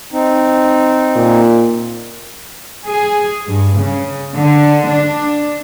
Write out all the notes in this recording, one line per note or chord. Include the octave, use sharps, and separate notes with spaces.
C4 D#4
A#2
G#4
G2
C#3
D3
D4